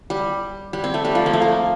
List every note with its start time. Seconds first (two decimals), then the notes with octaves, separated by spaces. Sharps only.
0.10 G3
0.73 G3
0.84 C4
0.94 A3
1.05 G3
1.15 F3
1.26 A#3
1.33 A3
1.42 A#3